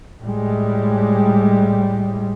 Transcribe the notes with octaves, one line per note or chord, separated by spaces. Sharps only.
A2 G3 G#3